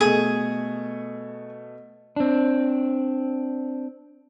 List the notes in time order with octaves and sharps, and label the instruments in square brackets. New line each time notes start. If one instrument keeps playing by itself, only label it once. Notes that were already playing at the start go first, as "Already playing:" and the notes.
[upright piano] B2 A3 [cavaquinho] G#4
[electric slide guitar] C4 D4